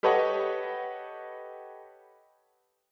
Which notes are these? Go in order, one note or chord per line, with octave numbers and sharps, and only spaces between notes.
G4 A4 B4 C#5 D#5 F#5